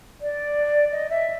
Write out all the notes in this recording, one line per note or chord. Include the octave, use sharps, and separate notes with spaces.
D5
D#5
E5